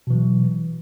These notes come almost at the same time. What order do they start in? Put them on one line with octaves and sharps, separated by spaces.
B2 E3 F#3